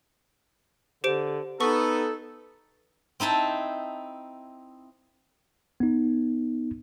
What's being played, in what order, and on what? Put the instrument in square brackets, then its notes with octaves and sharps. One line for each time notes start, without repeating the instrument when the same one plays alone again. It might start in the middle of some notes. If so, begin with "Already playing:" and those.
[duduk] D3 [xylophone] G4 C5 D7
[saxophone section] B3 [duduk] D#4 [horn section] A4 [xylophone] C#6
[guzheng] C4 D#4 E4 A5
[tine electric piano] B3 D#4